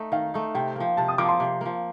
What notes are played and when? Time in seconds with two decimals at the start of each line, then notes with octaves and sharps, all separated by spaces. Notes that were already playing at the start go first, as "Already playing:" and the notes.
Already playing: A3 D#4
0.12 D#3 F5
0.34 A3 D#4
0.55 C3 G5
0.76 F3 A#3
0.97 C3 A5
1.08 D#6
1.18 F3 A#3 D6
1.29 C6
1.40 C3
1.61 F3 A#3